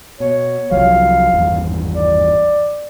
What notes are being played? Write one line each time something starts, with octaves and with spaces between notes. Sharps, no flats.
B2 C#5
C2 F3 F#3 F5
G#1 E2 G2
D5